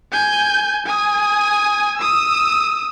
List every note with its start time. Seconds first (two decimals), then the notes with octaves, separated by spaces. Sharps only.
0.11 G#5 G6
0.86 G#5 D#6
1.97 D#6 E6